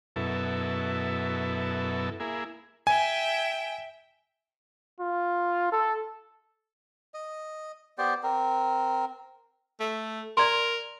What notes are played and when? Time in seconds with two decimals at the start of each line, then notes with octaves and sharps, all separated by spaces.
0.16 F#2 B2 E4 A4
2.20 A#3 E4 G#4
2.87 E5 G5 G#5
5.00 F4
5.72 A4
7.14 D#5
7.98 B3 G4 C5 D5
8.23 C4 A#4
9.80 A3
10.37 A#4 D5 A#5 C6